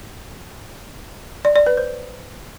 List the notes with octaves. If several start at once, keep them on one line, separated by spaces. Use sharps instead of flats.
D5
D5
B4
C5